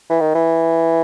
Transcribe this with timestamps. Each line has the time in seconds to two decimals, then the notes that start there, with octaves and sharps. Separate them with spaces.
0.10 E3
0.21 D#3
0.35 E3